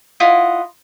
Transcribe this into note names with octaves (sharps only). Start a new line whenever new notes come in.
E4 F4 D#5 F#5